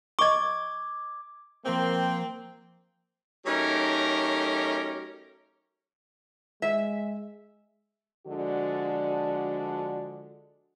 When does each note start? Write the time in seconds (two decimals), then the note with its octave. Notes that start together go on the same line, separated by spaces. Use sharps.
0.19 D#5 C#6 D6 G#6
1.66 F3 A#3 C4 A#4 G5
3.46 F#3 A3 C#4 D#4 G4 A#4
6.62 G#3 E5
8.26 D3 F3 G#3 D4 F#4